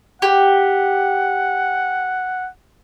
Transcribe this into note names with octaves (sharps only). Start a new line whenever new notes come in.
G4 F#5